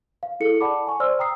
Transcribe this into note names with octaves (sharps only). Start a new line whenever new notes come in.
F5
E4 G#4 A4 C#7
D5 F#5 A5 B5 D6
G#5 C#6
C5 D5 C6 E6 F6
G5 A#5 D#6 C7